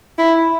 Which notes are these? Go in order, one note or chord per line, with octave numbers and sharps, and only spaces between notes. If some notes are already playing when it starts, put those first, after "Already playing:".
E4